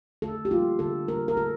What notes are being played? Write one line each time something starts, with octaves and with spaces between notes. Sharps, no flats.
D3 A4
G4
G3 A#3 F4
D3 A4
G3 A#3 A#4
A#4
D3 A4